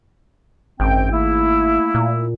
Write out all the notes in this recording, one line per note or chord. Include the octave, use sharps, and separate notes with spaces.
G#1 F#2 C4 G5
A3 A#3 E4
A#2